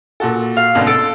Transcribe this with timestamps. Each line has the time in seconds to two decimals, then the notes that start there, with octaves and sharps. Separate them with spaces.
0.20 A#2 F#4 A4
0.57 F5
0.75 G#1 B2 D3
0.87 A4 E6 C#7 D7